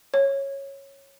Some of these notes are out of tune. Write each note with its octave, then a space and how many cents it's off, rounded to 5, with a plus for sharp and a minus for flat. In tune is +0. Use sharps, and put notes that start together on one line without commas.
C#5 -10